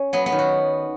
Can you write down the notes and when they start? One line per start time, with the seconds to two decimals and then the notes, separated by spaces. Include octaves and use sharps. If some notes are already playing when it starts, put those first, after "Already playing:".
Already playing: C#4
0.13 F#3 B3
0.26 B3
0.32 D#3
0.39 F#4